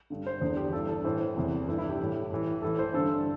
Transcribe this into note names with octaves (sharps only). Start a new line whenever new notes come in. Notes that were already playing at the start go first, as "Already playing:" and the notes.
G2 D3
C5
E2 D3
G4
G2 E3 A4
A4
A2 E3 C5
E2 C3 E3
G2 E3 A4
E4
G4
A2 E3
A2 E3
A2 E3 A4
C5
G2 D3 A4